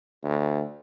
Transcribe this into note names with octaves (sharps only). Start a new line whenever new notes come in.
D2